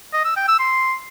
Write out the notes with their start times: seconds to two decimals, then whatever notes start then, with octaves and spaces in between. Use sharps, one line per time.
0.13 D#5
0.25 E6
0.36 G5
0.48 E6
0.59 C6